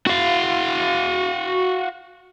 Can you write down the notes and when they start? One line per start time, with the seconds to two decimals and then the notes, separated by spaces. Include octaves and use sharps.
0.07 F#4 F5